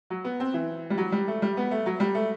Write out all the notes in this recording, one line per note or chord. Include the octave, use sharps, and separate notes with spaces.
F#3
B3
C4
E3
G3
F#3
G3
A3
G3
B3
A3
F#3
G3
A3